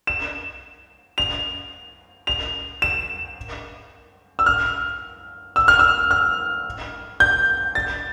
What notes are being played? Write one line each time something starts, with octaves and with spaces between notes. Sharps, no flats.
E7
F7
F7
E7
E6
F6
E6
F6
E6
F6
G6
A6